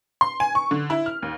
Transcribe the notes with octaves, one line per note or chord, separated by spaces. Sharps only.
C6
G#5
C#6
D3
E4
F6
D#2